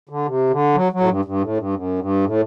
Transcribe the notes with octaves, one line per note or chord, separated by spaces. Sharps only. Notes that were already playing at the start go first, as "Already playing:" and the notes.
D3
C3
D3
F#3
F#3
A2
G2
G2
A2
G2
F#2
G2
A2